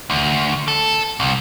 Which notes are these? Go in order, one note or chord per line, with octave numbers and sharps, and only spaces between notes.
D2
A4
C2